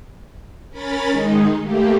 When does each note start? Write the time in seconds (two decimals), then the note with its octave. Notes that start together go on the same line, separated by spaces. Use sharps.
0.70 C#4 A#4 B5 A6
1.09 D#3 G#3 D#4
1.62 A3 A#3 G4